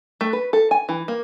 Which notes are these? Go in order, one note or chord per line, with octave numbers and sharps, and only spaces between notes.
A3
B4
A4
G#5
E3
A#3